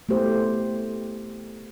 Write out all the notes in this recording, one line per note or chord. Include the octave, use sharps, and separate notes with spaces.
A3 B3 E4 G4 C5